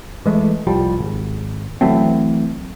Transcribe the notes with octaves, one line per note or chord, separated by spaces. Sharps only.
E3 G#3 A3
C2 F3 G3
G#1
E3 F#3 A3 C4